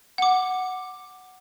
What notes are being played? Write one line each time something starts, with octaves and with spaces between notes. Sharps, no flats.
F#5 D6